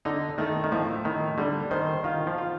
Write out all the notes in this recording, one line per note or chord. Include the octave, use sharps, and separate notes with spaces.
D3 D#4
D#3 A3
D#3
A2 F3
A2 D#3
D3 G3
D#3 C5
D#3 F4
F3
F4